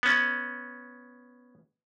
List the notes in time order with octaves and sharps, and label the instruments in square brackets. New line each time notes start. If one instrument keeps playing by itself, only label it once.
[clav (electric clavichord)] B3 C#4